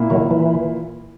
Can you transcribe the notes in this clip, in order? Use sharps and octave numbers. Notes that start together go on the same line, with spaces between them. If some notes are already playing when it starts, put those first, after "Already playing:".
Already playing: A#2 A#3 E4
D#3 F#3
E3